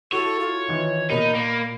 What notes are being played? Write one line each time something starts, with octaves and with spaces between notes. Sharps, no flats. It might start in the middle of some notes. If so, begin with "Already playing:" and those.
E4 F#4 A4 C#5
F4
D#3 E3
A#2 D#4 A#4 B5
A#3